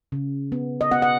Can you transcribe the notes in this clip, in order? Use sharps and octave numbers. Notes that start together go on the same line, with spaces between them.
C#3
B3
D#5
B3 F#5
F#5